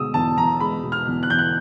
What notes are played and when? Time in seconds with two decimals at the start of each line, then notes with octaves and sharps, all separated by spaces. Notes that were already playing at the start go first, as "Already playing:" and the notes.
Already playing: B2 G#3 D#6 E6
0.14 E2 A5
0.37 E2 A#5
0.60 G#3 B5
0.83 B2
0.92 F6
1.08 E2
1.23 F#6
1.30 E2 G6
1.39 F#6